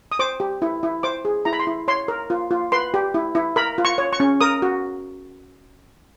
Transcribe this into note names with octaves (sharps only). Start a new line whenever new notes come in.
D#6
C5 D6
G4
E4
E4
C5 D6
G#4
E4 A#5
B5
C6
E4
C#5 C6
A#4
F4
F4
B4 C6
G4
E4
E4
A#4 B5
F4
C#6
C#5
C#6
C#4
A#4 D#6
F#4